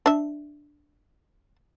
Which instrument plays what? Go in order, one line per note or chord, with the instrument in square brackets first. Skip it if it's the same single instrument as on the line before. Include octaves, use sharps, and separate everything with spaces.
[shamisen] D4 E5